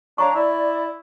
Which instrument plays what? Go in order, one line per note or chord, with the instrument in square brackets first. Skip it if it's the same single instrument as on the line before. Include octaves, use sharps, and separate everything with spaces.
[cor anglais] D4 [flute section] C#5 F5 A#5 [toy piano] C#6
[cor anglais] E4 [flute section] D5